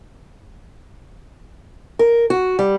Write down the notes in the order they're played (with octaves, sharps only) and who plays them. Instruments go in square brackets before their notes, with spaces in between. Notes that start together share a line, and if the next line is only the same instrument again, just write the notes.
[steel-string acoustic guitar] A#4
F#4
G3